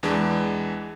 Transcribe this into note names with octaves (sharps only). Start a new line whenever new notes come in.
E2 E3 G#3 D4